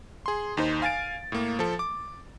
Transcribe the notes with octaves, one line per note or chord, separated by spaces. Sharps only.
G#4 C6
D#2 D#4 C5
F5 G#5 A6 D7
A2 A#3
F3 A4
D6